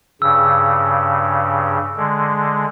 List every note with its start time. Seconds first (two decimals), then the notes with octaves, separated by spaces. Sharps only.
0.22 G2 C#3 E6
1.97 D3 G#3